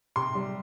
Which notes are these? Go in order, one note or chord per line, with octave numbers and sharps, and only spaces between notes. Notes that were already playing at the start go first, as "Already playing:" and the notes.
C3 C6
G3